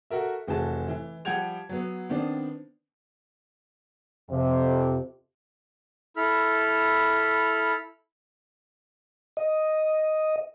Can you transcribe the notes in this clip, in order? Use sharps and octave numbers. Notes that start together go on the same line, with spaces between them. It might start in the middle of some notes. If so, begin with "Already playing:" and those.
F#4 A4 A#4 E5
F1 E3 F#4 G#4 A5
E3
F3 G3 F#5 G5 G#6 F7
F#3 B3
D#3 B3 C4 D4 D5
F2 C3
E4 A4 B5 F6
D#5